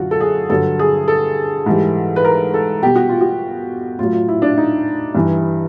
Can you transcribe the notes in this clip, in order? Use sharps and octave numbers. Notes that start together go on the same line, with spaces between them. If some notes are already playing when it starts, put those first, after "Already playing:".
Already playing: F#2 D3 F4 F#4
A4
G#4
G2 D3 F#3 A4
G#4
A4
G#2 E3 G3
B4
A#4
A4
B2 G3 G4
F#4
F4
F#4
A2 F#3 F4
F4
E4
D4
D#4
G2 E3 G3